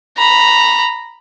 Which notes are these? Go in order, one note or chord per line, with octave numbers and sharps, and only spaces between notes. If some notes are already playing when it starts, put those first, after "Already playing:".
A#5 B5